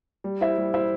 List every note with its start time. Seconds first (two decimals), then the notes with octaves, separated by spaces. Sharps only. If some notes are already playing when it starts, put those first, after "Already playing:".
0.24 G3
0.41 E4 C5 E5
0.58 G3
0.74 E4 C5 E5